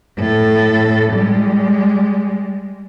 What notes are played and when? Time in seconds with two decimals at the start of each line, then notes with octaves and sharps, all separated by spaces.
0.18 A2 A4
1.13 G3 G#3